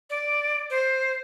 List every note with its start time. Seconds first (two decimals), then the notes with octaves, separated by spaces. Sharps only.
0.10 D5
0.70 C5